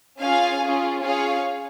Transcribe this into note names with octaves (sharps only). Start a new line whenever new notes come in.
C#4 F4 G#4 F5 G#5
C#4 F4 G#4
C#4 F4 G#4 C#5 F5